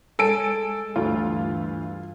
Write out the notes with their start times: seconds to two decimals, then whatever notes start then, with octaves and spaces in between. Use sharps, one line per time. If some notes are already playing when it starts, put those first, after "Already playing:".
0.19 G#3 A4 G#5 D7
0.96 D2 G2 E3 F4